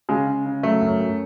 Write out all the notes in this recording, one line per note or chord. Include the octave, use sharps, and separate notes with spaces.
C#3 G#3
C#3
C#3
F#3 A3
F#2
F#2